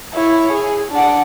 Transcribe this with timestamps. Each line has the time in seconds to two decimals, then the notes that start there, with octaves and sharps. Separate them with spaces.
0.14 E4 C#5
0.53 G#4
0.92 D4 F#5